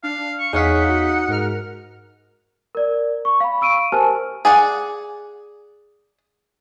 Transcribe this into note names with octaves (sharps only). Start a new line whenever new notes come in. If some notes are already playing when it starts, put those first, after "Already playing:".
D4 F5
C#6
E2 D#4 G#4 C#5 F5 F#5 B6
F#4
G#2 A#4 F6
A#4 D5
C#6
F5 B5
C#6 E6 D7 D#7
G4 A#4 C5 G#5 A5 F6
G#4 D5 F#5